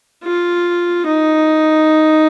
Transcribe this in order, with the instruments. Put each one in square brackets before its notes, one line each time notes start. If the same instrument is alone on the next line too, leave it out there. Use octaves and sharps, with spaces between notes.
[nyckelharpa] F4
D#4